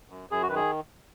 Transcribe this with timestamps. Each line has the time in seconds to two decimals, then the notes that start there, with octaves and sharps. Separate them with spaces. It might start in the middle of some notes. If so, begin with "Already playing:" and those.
0.10 F#2
0.29 F#2 G#4
0.43 F#4
0.49 D#3 B4
0.56 G#4